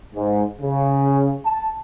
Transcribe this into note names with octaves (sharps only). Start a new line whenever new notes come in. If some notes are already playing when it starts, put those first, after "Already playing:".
G#2
C#3
A5